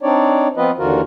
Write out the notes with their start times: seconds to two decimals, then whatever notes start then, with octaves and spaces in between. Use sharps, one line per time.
0.02 C4 D4 D#4 C#5 D5
0.57 F3 B3 C4 F4 B4 D#5
0.79 D#2 D3 E3 F4 F#4 A#4